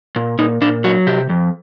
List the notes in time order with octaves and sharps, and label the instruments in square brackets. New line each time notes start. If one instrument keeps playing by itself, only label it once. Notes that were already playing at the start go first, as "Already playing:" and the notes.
[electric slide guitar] A#2
A#2 D#4
A#2 D4
F#3 F#4
C3 G4
F2